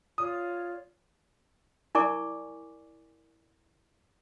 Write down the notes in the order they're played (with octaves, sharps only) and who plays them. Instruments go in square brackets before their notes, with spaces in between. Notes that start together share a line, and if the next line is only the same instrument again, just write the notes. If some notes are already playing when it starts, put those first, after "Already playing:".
[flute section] F4 C#5 D5 [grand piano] D#6
[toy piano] E4 A#4 D5 G#5 C#6 D6